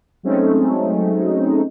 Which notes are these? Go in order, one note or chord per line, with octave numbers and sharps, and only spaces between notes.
F#3 G#3 A3 C4 C#4 D#4